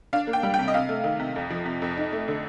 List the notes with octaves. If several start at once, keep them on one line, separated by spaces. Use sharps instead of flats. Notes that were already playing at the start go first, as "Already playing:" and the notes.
D4 F5
A#3
G5
G3
G5
C3
D#5
C3 F5
A3
D#3
C3
F2
F3
C3
F2
D#4
A3
D3